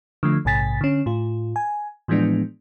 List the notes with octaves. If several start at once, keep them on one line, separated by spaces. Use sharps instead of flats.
D3 F3 A3
A#1 G#2 C3 G#5 A6 B6
D3 C#4
A2 F4
G#5
A2 E3 F3 G#3 B3 D4